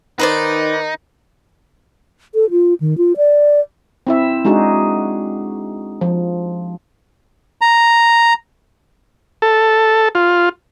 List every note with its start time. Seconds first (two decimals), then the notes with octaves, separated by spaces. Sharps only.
0.19 D#3 D#4 B4 C5 D5
2.35 A4
2.51 F4
2.80 D#3
2.98 F4
3.17 D5
4.07 C4 E4 E5
4.45 G#3 D4 D#4 F#4 G#4
6.01 F3
7.61 A#5
9.42 A4
10.15 F4